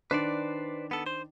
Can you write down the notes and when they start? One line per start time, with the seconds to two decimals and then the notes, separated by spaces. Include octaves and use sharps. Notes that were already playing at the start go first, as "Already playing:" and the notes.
0.11 D#3 D4 B4 C5 D5
0.91 B3 A4
1.06 C5